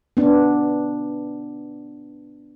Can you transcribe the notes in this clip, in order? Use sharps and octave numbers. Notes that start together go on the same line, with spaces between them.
B3 D4